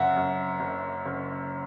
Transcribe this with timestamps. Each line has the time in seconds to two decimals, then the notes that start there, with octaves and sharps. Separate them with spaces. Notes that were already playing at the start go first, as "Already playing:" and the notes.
Already playing: F#1 F#2 E5 F#5
0.16 F#2
0.60 F#1
1.06 F#1